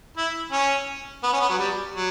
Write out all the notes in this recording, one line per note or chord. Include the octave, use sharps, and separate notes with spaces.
E4
C#4
B3
C#4
B3
F#3
G3
F#3